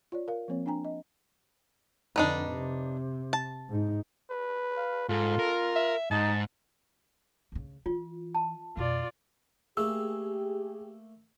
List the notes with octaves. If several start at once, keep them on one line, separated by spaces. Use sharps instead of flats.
F4 C#5 D5
A#4 F5
F3 A#3 C4 C#5
D4 G5 G#5 A#5
D#5
F2 D3 D4 D#4 B4
C3
A5
G#2 D#4
B4
F5
G#2 F4 A4
A#4
E5
G#2 D#4 A5
D2 C#3
E3 F4
A5
F2 B2 F4 D5
A3 A#3 G4 G#4 E6